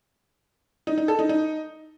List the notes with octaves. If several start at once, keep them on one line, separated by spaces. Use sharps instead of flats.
D#4
D#4
A4
D#4
D#4